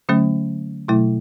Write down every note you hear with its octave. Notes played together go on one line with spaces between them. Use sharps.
D3 F#3 A3 C#4
B2 F#3 A3 E4